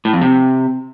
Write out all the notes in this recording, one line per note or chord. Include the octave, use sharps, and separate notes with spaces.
A2
F2
C3